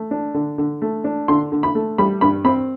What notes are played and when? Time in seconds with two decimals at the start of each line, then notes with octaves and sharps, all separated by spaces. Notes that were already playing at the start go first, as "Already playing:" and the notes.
Already playing: A3
0.11 D4
0.34 D3
0.58 D3
0.82 A3
1.04 D4
1.28 D3 C6
1.52 D3
1.63 B5
1.75 A3
1.98 G3 B5
2.21 G2 B5
2.44 C4 B5